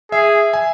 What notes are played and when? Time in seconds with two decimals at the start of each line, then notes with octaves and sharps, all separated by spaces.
0.12 G#4 E5
0.53 G#5